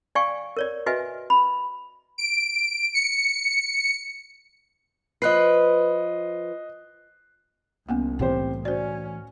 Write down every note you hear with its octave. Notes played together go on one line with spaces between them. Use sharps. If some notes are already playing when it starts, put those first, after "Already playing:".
D5 F5 G5 G#5 C#6
A#4 C#5 D5
F#4 B4 D#5 E5 G#5
B5
D7
C#7
F3 B4 D#5 F#6 C7
C2 A#3 B3 C#4
A2 C3 E3 G4 C5
C#4 F#4 C5 D5